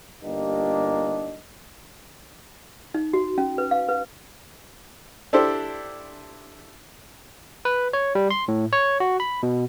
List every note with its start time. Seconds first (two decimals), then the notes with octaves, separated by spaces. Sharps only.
0.23 G1 A#3 D4 D#4 G4 D#5
2.94 D#4
3.13 F#4
3.38 C#4
3.58 B4
3.71 F5
3.89 B4
5.33 D4 E4 G4 A4 C5
7.65 B4
7.93 C#5
8.15 G3
8.30 C6
8.48 A2
8.73 C#5
9.00 F#4
9.20 B5
9.43 B2